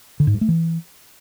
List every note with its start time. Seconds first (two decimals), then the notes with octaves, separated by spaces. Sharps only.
0.20 D3
0.27 G#2
0.34 G2
0.41 A3
0.49 E3